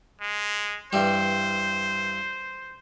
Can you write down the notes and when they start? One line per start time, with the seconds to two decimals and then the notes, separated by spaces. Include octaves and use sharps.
0.21 G#3
0.93 G2 E3 G3 C5